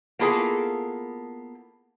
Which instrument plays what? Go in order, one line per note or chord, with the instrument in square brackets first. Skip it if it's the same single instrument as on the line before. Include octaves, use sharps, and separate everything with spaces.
[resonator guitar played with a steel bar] A#3 B3 E4 F4 G#4 A4